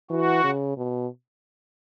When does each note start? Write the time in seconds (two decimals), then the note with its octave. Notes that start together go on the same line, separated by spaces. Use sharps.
0.10 E3 F#4
0.44 C#3
0.77 B2